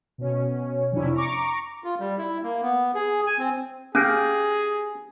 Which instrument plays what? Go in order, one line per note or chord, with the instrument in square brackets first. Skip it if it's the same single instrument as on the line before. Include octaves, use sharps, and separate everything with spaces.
[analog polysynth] B2 C#4
F2 C3 C#4 D4 E4
A#5 C#6 D6
[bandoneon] F4
G3
E4
A#3
B3
G#4
G#5
C4
[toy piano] C#4 [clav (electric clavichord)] G4 F5 [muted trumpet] G#4 [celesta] G#5 A#6 D7